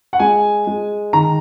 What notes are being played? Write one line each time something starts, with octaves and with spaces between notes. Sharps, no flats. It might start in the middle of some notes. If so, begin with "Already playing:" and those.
F#5
G#3 G#5
G#3
D#3 A#5